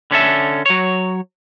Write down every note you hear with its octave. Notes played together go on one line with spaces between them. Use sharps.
D3 C#4 A4 E5
F#3 C#5